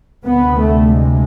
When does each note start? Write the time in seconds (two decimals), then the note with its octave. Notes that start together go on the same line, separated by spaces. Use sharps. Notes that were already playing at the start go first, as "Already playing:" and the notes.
0.24 D2 C3 B3
0.60 A3
0.94 G#3